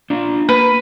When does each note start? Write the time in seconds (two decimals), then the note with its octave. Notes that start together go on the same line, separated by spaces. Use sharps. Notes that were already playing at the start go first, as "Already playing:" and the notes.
0.10 D4 F4
0.49 A#3 B4